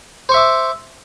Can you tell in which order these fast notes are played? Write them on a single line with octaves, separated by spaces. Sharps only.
C5 C#6 E5 D6